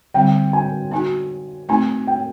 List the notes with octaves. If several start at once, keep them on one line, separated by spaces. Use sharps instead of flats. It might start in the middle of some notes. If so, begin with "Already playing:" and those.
D3 G3 C4 G5
G#5
B3 D#4 F#4 G#5
A3 C4 D#4 G#5
G5